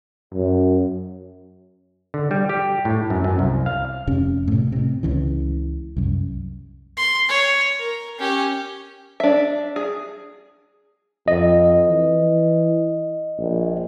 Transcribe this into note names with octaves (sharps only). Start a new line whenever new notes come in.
F#2
D3
G3
G4
A2
F#2
F#2
C2
F5
F1 C3 C#4
A2 C3
A2 C3
C#2 C#3 E3
C2 F#2
C6
C#5
A#4
C#4 G4
D4 E5
G#4
F2 D#5
E3
A#1